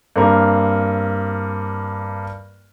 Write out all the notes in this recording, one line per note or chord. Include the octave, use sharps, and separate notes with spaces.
G2 A#3 C4 A#4